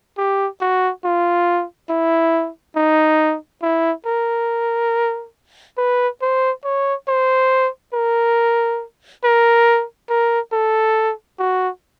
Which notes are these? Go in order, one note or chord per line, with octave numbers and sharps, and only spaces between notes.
G4
F#4
F4
E4
D#4
E4
A#4
B4
C5
C#5
C5
A#4
A#4
A#4
A4
F#4